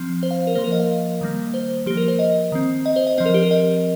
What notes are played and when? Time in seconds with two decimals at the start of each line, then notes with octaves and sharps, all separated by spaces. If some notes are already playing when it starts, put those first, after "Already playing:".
Already playing: F3 C4
0.23 C5
0.31 F5
0.47 A#4
0.55 F3 A#3 C5
0.64 A#4
0.72 D#5
0.79 F5
1.21 D#3 G3 A#3
1.54 C5
1.86 F3 G4
1.90 A#3
1.97 A#4
2.08 C5
2.19 D#5
2.52 D#3 C4
2.86 D#5
2.96 C5
3.07 D#5
3.18 F3 C4 D#5
3.26 A#4
3.34 G4
3.43 A#4
3.51 D#5